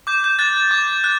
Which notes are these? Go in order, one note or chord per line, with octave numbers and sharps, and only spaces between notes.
D6 G6
G6
F#6 A6
D6 G#6
F#6